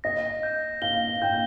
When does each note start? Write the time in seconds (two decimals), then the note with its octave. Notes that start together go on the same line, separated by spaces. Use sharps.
0.04 D#5 A#6
0.43 G6
0.82 F5 G7
1.22 G5 G6